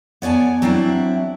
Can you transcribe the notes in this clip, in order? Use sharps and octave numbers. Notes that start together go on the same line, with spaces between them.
B3 C#5 D5 G#5 A5
F#3 C4 D4 E4